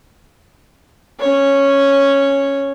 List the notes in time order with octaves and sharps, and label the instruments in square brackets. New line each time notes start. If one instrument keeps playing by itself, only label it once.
[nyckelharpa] C#4 C#5